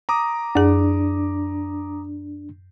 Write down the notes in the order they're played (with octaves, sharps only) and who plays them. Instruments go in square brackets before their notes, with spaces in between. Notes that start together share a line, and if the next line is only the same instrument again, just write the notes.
[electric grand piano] A#5 D6 D#6
[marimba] F#2 G#4 [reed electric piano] D4